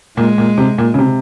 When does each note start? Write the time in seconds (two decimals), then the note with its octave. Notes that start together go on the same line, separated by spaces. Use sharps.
0.17 A#2 G#3
0.38 A#2
0.58 C3
0.78 A#2
0.94 C#3
0.99 C3